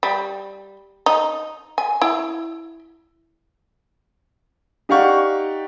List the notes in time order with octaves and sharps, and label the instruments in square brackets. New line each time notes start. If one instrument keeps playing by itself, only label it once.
[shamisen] G3
D#4
G#5
E4
[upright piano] D#4 G4 D5 F5 F#5 C#6